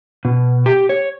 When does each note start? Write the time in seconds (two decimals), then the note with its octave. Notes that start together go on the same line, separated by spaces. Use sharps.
0.25 B2
0.66 G4
0.89 C#5